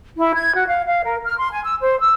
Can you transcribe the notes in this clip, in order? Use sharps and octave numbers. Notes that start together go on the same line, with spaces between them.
E4
G#6
F#4
F5
F5
A#4
F6
C6
G#5
E6
C5
E6